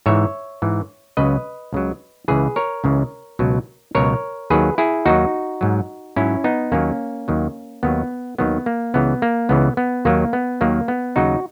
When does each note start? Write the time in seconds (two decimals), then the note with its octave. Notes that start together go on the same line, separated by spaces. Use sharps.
0.06 G#2 E3 C#5 E5
0.62 G#2 E3
1.17 C#2 C#3 F#3 B4 D#5
1.73 C#2 C#3 F#3
2.28 C#2 C#3 E3 G#4 B4
2.56 A#4 C#5
2.84 C#2 C#3 E3
3.39 C#2 B2 F#3
3.95 C#2 B2 F#3 A#4 C#5
4.50 D#2 D#3 F#3 G#4 B4
4.78 E4 G#4
5.05 D#2 D#3 F#3 D#4 F#4
5.61 G#2 F#3
6.16 G#2 F#3 C#4 E4
6.44 B3 D#4
6.72 D#2 D#3 F#3 A#3 C#4
7.28 D#2 D#3 F#3
7.83 D#2 D#3 F#3 B3
8.38 D#2 D#3 F#3 B3
8.66 A#3
8.94 C#2 C#3 E3 B3
9.22 A#3
9.49 C#2 C#3 E3 B3
9.77 B3
10.05 D#2 D#3 F#3 A#3
10.33 B3
10.61 D#2 D#3 F#3 A#3
10.88 B3
11.16 D#2 C#3 F#3 D#4 F#4